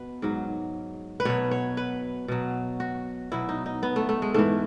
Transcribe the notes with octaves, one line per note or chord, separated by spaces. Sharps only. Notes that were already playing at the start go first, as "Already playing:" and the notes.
Already playing: B2 B4
G#2 F#3
B4
B2 F#3 C#5
C#5
B4
B2 F#3
F#4
B2 F#3 E4
D#4
D#4
B3
A3
A3
G#3
G#2 E3 A3